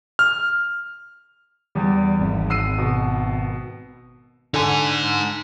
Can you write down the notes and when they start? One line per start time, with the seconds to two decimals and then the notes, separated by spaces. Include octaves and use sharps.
0.19 F6
1.75 E2 G3
2.20 G#1
2.50 E6 C7 D#7
2.78 B2
4.54 D3 D#4 G#5